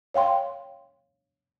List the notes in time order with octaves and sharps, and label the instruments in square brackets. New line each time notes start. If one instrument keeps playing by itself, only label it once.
[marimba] C#5 F5 G5 C6